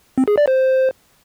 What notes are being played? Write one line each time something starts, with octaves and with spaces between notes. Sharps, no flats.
C4
G#4
D5
C5